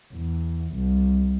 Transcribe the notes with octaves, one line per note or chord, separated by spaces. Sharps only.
E2
C2